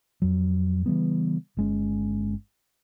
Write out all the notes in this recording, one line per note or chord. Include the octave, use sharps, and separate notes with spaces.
F2 F#3
C#3 E3 G3 B3
G1 G#3 C#4